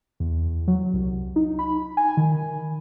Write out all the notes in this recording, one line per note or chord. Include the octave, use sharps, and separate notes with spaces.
E2
F#3
C2
D#4
B5
G#5
D#3